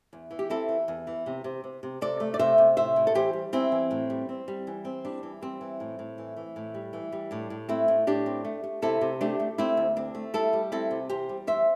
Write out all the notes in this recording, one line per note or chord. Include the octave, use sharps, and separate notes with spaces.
E2
E3
G4
C4 E4 A4
E3
E2
E3
C3
C3
C3
C3
C3 A4 D5
A3
D5
C3 C5 E5
C3
A2 C5 E5
A2
A4
E3 G4 C5
G3
E3 C4 E4
E3
A2
G3
C4
G3
E3
C4
G3 D4
E3
G3 C4
E3
A2
A2
E3
E3
A2
G3
E3
G3
A2 D4
A2
A3 C4 E4
A2
A2 D4 G4
C4
A3
A3
C3 E4 A4
C3
A3 D4 G4
A3
A3 C4 E4
D2
C4 D4
A3
G3 E4 A4
G3
C4 E4 A4
C3
E2 G4 C5
G3
E2 C5 E5